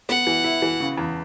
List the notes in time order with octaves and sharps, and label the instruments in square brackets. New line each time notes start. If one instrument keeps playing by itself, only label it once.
[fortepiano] B3 [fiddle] F#5
[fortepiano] E3
E4
E3
C#3
E2